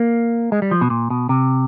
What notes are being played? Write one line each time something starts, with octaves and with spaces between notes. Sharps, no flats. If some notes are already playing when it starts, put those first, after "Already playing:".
Already playing: A#3
G#3
G3
F3
B2
A#2
B2
C3